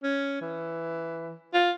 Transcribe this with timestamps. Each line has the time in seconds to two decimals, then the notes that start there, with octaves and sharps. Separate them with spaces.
0.03 C#4
0.41 E3
1.54 F4